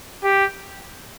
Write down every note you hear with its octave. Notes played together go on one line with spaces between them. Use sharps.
G4